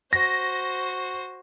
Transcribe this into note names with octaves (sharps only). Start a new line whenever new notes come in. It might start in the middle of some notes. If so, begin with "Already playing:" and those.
F#4 C5 A#6